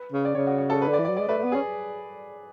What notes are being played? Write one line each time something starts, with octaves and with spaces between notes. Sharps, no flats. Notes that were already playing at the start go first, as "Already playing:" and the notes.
Already playing: B4
C#3
D5
C#3 C#5
F#4
F#4
A4
B4
D3
D5
E3
D5
F#3
G#3 D5
A3 B4
A3
B3
C#4 G#4